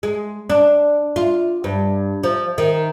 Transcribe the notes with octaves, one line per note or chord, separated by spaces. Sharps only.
G#3
D4
F4
G2
F3
D#3